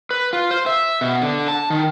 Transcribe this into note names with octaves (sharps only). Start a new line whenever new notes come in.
B4
F4
C5
E5
B2
D3
A5
D#3